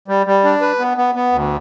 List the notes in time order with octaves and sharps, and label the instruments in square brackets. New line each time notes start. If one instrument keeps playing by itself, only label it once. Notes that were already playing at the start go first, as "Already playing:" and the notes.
[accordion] G3
G3
D4
B4
B3
B3
B3
D2